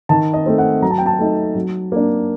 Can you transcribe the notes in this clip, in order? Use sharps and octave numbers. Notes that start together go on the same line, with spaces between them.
D#3 A5
D#5
A3 C4
F#5
F#3 A#5
A5
G5
A5
A3 D#4
F#3
A#3 D4